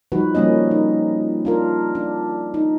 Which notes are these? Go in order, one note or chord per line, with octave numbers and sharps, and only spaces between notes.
F3 G3 D#4 F#4 B4
F3 G3 A#3 C#4 D#5
D#4
D4 F4 A#4
D4
D#4